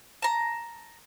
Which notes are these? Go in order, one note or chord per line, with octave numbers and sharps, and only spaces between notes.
A5 A#5